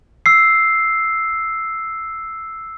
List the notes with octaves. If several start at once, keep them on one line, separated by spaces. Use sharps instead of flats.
E6 C7